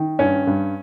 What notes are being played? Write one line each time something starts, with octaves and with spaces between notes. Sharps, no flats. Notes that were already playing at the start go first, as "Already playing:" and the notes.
Already playing: D#3
G2 C#4
G2